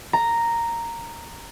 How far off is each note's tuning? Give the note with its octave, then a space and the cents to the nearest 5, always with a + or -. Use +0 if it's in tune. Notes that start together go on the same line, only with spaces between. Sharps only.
A#5 -5